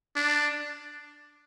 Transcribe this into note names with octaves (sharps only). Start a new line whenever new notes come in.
D4